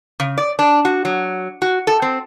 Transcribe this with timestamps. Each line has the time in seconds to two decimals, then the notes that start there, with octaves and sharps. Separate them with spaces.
0.20 C#3
0.38 D5
0.59 D4
0.85 F#4
1.05 F#3
1.62 F#4
1.87 A4
2.02 C4